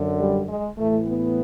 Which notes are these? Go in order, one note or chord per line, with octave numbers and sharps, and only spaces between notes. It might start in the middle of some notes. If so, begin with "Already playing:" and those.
Already playing: F#2 D3
G3
G#3
A2 E3 A3
B3